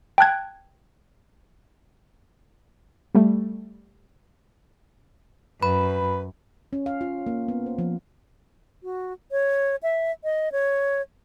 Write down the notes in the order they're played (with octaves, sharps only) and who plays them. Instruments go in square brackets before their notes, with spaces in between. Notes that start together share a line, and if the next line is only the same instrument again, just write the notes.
[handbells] G5 A5 F#6 G#6
[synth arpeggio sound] G3 A3
[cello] F#2 [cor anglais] B4 [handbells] B5
[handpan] C#4
F5
F4
A#3
B3
C5
F3
[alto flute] F#4
C#5
E5
D#5
C#5